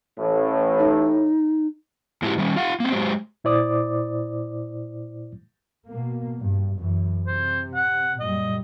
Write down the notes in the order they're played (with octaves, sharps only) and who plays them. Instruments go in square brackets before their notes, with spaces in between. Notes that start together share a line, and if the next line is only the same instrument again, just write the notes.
[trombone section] A1 A2
[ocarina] D#4
[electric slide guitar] A2 G#3 E4 F#4 G4
D#3 G3 C#4
F4 F5 F#5
A#3 C4
F#3 G#3 G4 C5
[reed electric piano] A#2 E4 C5 D5 D6 D#6
[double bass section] B2 A#3
G2
F#2 E3
[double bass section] C3 [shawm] C5
[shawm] F#5
[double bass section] F#2 A#2 G3 [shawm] D#5